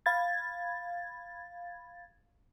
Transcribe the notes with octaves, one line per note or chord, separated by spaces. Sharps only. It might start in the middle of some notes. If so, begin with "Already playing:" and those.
F5 B5 G#6 A6